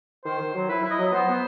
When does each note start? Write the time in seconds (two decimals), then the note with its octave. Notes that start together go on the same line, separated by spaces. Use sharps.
0.24 D#3 C5
0.40 D#3
0.54 F#3
0.69 E4 B4
0.84 E4
0.90 D#5
0.98 F#3
1.12 B3 C5
1.28 B3